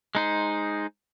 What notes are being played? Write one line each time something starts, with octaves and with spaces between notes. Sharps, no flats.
G#3 D#4 C5